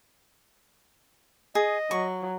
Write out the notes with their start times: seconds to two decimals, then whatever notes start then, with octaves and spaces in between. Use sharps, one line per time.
1.55 G#4 D#5
1.91 F#3 C#6